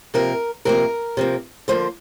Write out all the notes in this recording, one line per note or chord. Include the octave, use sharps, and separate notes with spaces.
C3 F3 A#3 A#4
C3 F3 A#3 A#4
C3 F3 A#3
D3 F3 A#3 C5